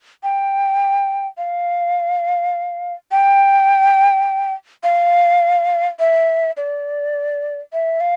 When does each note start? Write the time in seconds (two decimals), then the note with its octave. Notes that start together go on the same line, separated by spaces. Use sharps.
0.23 G5
1.38 F5
3.11 G5
4.83 F5
5.99 E5
6.57 D5
7.73 E5
8.00 F5